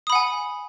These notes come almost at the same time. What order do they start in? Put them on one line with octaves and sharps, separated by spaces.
D#6 B5 F#5 G#5